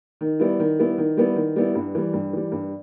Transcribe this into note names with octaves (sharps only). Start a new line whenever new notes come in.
D#3
G3 B3 E4
D#3
G3 B3 E4
D#3
G3 B3 E4
D#3
G3 B3 E4
G2
E3 G3
G2
E3 G3
G2